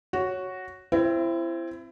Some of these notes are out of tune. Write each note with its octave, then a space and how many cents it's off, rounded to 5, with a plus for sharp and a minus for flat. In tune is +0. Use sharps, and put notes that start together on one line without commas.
F#4 +0 C#5 +0
C4 +0 E4 +30